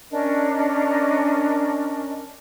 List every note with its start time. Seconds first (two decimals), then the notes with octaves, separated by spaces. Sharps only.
0.11 C#4 D4 A#4 D#5